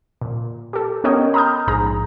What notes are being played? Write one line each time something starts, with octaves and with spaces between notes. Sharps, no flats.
A#2
G4 A4
B3 C#4 A#4 C#5 D#5 G5
A#5 B5 D#6 F6 G6
A#1 G#2 G#4 A#5